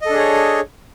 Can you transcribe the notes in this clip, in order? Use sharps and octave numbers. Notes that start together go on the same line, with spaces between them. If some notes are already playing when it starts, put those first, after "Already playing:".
D4 G#4 A4 C#5 D#5